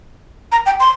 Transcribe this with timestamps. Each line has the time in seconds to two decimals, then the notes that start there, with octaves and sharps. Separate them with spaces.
0.52 A#5
0.66 G5
0.80 C6